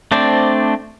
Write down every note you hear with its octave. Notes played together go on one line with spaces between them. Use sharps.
A3 C4 D4 C5 D5